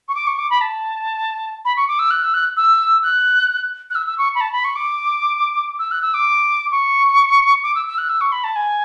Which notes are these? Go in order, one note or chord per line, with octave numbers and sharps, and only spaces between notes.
C#6
D6
C#6
D6
B5
A5
B5
C#6
D6
E6
F#6
E6
F#6
E6
F#6
F#6
E6
E6
C#6
B5
A5
B5
C#6
D6
E6
F#6
E6
D6
C#6
D6
E6
E6
F#6
E6
C#6
B5
A5
G#5